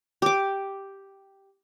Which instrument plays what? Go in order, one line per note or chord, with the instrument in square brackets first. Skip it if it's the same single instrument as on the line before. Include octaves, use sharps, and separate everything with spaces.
[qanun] G4 D6